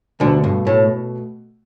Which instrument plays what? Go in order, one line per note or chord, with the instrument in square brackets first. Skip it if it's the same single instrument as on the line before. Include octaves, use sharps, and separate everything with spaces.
[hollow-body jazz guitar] D2 D3 [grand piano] B2 A3 G4
[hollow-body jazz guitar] G2
A2